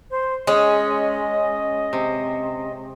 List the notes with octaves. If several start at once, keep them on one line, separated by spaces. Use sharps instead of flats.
C5
G#3 C#4 D#5
C3